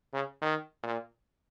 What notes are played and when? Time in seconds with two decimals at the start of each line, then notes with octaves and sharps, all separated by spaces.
0.13 C#3
0.41 D#3
0.83 A#2